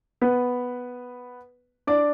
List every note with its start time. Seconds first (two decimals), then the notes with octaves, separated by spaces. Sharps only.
0.21 B3 B4
1.87 D4 D5